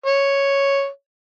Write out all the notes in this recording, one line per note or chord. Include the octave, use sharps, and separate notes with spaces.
C#5